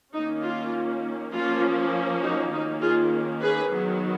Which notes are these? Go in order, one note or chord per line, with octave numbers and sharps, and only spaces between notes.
D#3 A#3 C#4 D#4
F4
F3 A#3 C#4 F4
D#4 F#4
D#3 A#3 C#4 D#4
F4 G#4
G#4 B4
D#3 F#3 B3